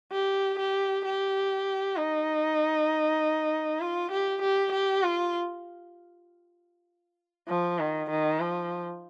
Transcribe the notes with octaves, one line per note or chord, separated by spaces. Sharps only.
G4
G4
G4
D#4
F4
G4
G4
G4
F4
F3
D#3
D#3
F3